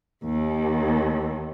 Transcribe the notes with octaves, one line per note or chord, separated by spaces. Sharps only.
D#2